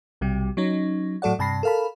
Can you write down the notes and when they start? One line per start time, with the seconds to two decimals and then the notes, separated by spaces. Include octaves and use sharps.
0.21 B1 C3 G3
0.57 F#3 C#4 D#4
1.22 A2 F#3 A4 D5 F#5
1.39 G2 C3 A5 B5 A#6 C7
1.63 A4 A#4 F5 A5 B5